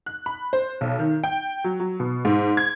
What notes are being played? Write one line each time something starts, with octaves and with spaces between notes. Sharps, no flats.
F#6
B5
C5
B1
D#3
G5
F#3
F#3
B2
G#2
G#6